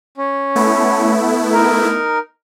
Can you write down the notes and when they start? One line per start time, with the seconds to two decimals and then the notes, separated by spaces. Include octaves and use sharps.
0.17 C#4
0.56 A3 B3 E4
1.53 D#4 A#4